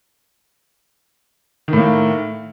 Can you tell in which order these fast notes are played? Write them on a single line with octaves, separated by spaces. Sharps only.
D#3 A2 A#3